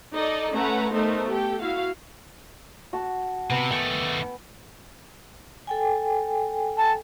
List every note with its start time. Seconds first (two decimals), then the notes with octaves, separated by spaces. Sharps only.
0.14 D#4 A4 D5 D#5
0.54 A3 C#4 B4 F#5 A#5
0.93 A3 B3 D#4 A#4 C5
1.30 G4 A4 G5
1.60 E4 F#4 F5
2.93 F#4 A5
3.50 C3 B3
3.71 D#3 A3 G5 G#5
5.67 A4 G5 G#5
6.78 A5